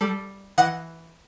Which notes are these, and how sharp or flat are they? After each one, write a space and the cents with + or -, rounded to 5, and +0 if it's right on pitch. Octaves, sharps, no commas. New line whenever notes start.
G3 +0 A4 +0
E3 +0 D#5 +0 F#5 -5